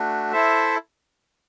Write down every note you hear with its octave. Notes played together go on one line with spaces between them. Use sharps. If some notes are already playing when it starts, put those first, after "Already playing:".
Already playing: A3 D4 F#4
E4 A4 C5 E5